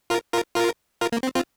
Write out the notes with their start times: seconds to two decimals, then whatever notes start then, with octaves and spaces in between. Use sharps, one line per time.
0.10 F4 A#4
0.33 F4 A#4
0.55 F4 A#4
1.01 F4 A#4
1.12 A#3
1.23 C4
1.35 C4 F4